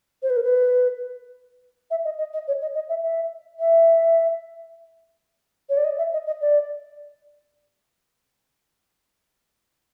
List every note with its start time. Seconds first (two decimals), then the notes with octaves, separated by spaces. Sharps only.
0.23 C5
0.30 B4
0.36 A#4
0.43 B4
1.91 E5
2.05 D#5
2.18 D#5
2.34 D#5
2.48 C#5
2.62 D#5
2.75 D#5
2.89 E5
3.03 E5
3.60 E5
5.69 C#5
5.77 D5
5.84 D#5
5.98 E5
6.13 D#5
6.27 D#5
6.41 D5